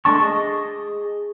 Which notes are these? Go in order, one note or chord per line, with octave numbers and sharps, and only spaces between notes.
G#3 A3 D4 A5 C#6
G#4 D#5